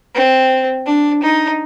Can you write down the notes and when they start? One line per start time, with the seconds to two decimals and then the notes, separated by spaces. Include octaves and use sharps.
0.15 C4
0.86 D4
1.23 D#4